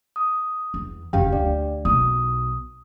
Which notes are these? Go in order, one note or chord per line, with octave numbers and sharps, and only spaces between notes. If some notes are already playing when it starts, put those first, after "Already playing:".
D#6
E2
F#1 F2 G4 F5 G5
D2 D4 D5
B1 B3 D#6